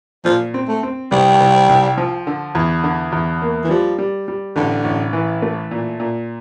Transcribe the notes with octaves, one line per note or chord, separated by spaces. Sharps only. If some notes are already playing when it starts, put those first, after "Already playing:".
A#2 F3
C4
A3
C4
C2 G3
C2
C2
F3
D3
E2
D3
E2
A#3
E3
F3 G3
G3
G3
A1 D3
A1
E3
A3
A#2
A#2